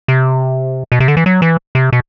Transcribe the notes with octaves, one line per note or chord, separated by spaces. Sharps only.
C3
B2
C3
D3
E3
F#3
E3
C3
B2